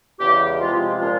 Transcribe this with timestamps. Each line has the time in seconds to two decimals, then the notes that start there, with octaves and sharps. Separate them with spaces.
0.20 E2 C#3 E3 G#3 G4
0.60 C3 F3 G#3 F4
0.99 A#2 F3 G#3 C#4 F4